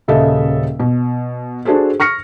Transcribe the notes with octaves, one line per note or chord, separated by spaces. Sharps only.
D#1 C#3 A4 D#5 E5
B2
D4 F#4 G#4 A4 C5
C#6 F6 A#6 C#7